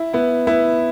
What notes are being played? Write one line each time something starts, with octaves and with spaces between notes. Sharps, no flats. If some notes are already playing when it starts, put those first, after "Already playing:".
Already playing: E4
B3 E4
B3 E4